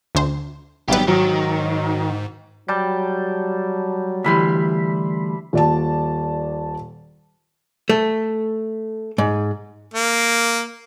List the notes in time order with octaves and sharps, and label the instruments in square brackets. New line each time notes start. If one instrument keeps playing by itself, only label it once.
[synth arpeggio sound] D2 C5
[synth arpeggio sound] G#1 B4 [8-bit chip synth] F#3 G3 B3 [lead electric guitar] G4
[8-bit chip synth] G#2 [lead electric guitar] D#3 [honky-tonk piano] F#3
[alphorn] F#3 [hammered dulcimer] G3 G5 A5
[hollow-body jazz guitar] D2 E3 G3 [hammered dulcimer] E5 B5 C6
[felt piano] D#1 D5 A5
[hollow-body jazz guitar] A3
G#2
[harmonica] A#3